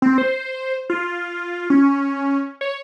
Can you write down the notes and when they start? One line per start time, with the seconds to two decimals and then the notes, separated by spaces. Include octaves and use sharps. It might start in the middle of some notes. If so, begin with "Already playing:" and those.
0.02 C4
0.18 C5
0.90 F4
1.70 C#4
2.61 C#5